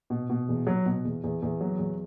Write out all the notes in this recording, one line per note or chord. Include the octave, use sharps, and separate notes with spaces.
B2
B2
E2
F#3
B2
E2
E2
E2
F#3
E2